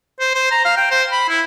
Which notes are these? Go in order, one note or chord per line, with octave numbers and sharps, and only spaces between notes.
C5
C5
A#5
F5
G5
C5
B5
E4